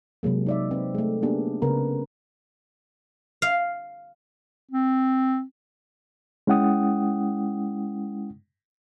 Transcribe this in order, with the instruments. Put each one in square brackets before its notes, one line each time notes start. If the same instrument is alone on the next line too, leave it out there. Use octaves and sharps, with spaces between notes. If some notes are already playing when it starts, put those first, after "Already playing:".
[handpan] C3 F#3 G#3 A#3
D#4 D5 E5
C4 B4
G#3 A3
A#3 B3 D4 G4 G#4
C#3 B3 A#4 B4
[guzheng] F5
[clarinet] C4
[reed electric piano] G#3 C#4 E4 F#5 G5 D#6